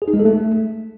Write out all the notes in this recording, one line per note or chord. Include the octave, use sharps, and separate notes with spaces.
G#4
D#4
G#3
A4
A3